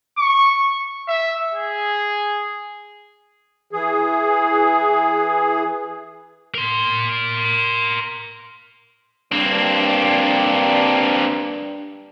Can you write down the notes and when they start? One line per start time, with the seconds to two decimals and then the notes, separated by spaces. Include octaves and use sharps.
0.19 C#6
1.08 E5
1.55 G#4
3.73 E3 G#4
6.54 A#4 C6
9.32 G2 A#3 C4 D4